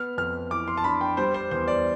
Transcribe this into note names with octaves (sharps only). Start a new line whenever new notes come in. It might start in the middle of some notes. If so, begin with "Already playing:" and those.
Already playing: B3 F6
F2 F6
E3 D6
C6
A5
D4 B5
G5
G3 C5
C5
E2 C5
D5